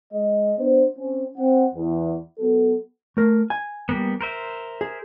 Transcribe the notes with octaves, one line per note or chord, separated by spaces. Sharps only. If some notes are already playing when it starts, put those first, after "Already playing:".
G#3 D#5
B3 D4 C5
C4 C#4
C4 F#5
E2
F#3 B3 A4
A3 A#4
G#5
G3 A#3 B3
A#4 C5 E5
G#4